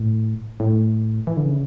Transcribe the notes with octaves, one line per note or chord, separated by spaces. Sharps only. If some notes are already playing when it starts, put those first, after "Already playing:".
Already playing: A2
A2
E3
D3
C#3